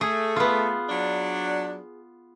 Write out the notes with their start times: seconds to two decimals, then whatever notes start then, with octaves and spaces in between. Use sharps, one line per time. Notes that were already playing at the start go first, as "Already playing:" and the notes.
0.01 A3 G#4
0.36 B3 F4
0.90 F#3 D4